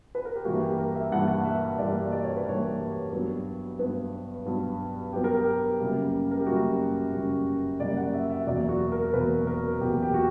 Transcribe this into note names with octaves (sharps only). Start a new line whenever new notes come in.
B4
A#4
G4
G2 E3 G3 A#3 F#4
G4
A#4
E5
G2 E3 G3 A#3 F#5
F#5
E5
G2 E3 G3 A#3 D5
D5
C#5
B4
G2 E3 G3 A#3 C#5
G2 F#3 B3
G2 F#3 B3 B4
G2 F#3 B3
G2 F#3 B3 G4
A#4
G4
F#2 C#3 G3 A#3
A#4
G4
F#2 C#3 G3 A#3 F#4
F#2 C#3 G3 A#3
F#2 C#3 G3 A#3 D5
F#5
E5
E5
E2 B2 F#3 A#3 D5
F#4
A#4
E2 B2 F#3 A#3 B4
A#4
E2 B2 F#3 A#3 G4
G4
F#4